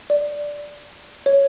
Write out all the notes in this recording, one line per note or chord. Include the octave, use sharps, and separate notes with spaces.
D5
C#5